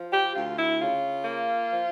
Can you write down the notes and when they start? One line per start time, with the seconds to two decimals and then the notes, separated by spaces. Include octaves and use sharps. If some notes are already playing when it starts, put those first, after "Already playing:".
Already playing: F3
0.12 G4
0.35 D2 F4
0.58 E4
0.80 C#3 F4
1.25 A#3
1.70 F3